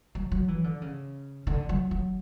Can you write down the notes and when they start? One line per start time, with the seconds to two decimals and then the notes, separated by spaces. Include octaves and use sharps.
0.15 F#3
0.32 F#3
0.48 E3
0.64 D3
0.82 C#3
1.47 D3
1.69 F#3
1.91 F#3